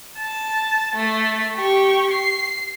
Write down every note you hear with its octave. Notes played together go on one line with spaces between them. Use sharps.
A5
A3
G4 C#6
C7